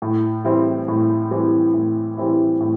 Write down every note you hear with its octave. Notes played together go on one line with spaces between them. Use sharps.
A2
E3 G3 C4 E4
A2
E3 G3 C4 E4
A2
E3 G3 C4 E4
A2